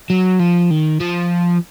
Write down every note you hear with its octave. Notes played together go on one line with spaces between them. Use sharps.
F#3
F3
D#3
F3